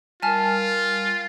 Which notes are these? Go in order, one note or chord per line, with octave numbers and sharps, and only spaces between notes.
G3 F4 A#4 G#5 A5 F6